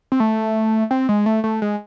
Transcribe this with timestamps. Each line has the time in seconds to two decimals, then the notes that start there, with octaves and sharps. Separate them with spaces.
0.12 C4
0.20 A3
0.91 C4
1.09 G#3
1.26 A3
1.44 A3
1.62 G#3